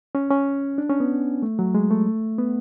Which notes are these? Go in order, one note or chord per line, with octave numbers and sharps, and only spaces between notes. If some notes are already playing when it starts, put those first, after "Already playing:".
C#4
C#4
D4
C#4
B3
A3
F#3
G#3
A3
B3